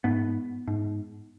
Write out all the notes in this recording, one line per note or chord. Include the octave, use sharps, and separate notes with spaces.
G#2 B3
G#2